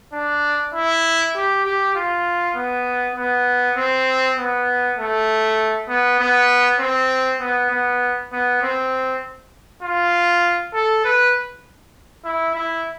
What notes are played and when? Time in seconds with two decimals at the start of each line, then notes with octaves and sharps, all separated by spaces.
0.13 D4
0.74 E4
1.35 G4
1.64 G4
1.95 F4
2.56 B3
3.16 B3
3.77 C4
4.38 B3
4.98 A3
5.88 B3
6.20 B3
6.79 C4
7.40 B3
7.71 B3
8.32 B3
8.62 C4
9.83 F4
10.74 A4
11.05 B4
12.25 E4
12.55 E4